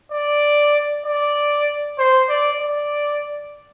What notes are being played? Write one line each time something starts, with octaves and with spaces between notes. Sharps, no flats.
D5
D5
C5
D5
D5